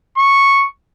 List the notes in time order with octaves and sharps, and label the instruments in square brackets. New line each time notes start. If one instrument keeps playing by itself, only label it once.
[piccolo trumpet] C#6